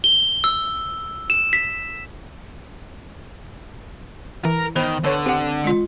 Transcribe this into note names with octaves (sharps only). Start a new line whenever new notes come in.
G7
E6
E7
B6
E3 A#4
D#3 B3 C5 B5
D3 A4 B4 C#5
C4 G4 F#5
G#3 F4